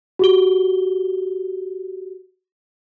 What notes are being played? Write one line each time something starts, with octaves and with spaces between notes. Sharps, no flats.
F#4 G4 G7